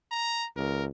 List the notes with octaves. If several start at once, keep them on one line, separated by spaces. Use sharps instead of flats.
A#5
C#2 A#4